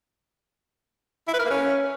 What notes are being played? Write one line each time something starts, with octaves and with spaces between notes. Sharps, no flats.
E4
B4
A#4
A#3
C#4